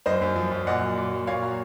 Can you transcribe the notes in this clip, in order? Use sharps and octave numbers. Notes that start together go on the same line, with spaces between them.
F#2 C5 D#5
F#2
F3
F#2
A#2 D#5 F#5
F#3
A#2
F#3
A#2 C#5 F5
F#3